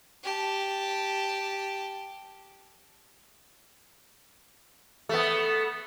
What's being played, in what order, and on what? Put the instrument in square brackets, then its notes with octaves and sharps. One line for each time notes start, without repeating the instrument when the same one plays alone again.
[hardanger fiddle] G4 A5
[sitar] A3 B3